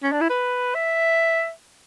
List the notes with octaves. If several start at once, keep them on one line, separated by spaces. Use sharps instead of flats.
C#4
D4
E4
B4
E5